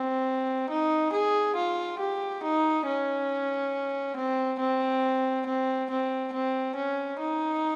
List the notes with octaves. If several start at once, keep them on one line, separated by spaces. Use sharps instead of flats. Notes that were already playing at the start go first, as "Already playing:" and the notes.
Already playing: C4
D#4
G#4
F4
G4
D#4
C#4
C4
C4
C4
C4
C4
C#4
D#4